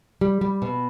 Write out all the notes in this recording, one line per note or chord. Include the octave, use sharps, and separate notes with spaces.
G3
G3
B2